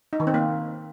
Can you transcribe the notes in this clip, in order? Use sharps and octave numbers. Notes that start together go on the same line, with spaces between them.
D#4
D#3
C4
A#3